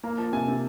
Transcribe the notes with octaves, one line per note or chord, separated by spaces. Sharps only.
A#3 A#5
F3 A5
C3 G#5
C3